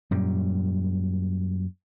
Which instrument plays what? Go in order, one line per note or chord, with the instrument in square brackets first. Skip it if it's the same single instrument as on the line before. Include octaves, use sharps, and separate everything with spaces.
[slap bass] F#2 A#2 G3